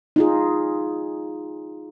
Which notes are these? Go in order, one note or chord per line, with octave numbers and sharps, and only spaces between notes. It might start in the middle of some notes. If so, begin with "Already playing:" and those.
D#4 F4 G#4